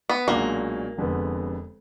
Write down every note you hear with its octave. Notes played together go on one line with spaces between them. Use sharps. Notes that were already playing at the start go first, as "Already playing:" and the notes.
B3
B1 A#2 G#3 A#3 D4 F#4
F1 F2 D3 G#3 B3